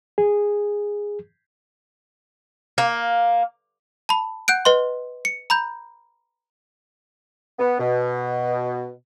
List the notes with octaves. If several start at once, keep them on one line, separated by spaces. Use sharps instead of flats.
G#4
A#3
A5 B5
F#5 F#6 G6 D7
B4 D#5 C6
C#7
A#5 B5 G6
B3
B2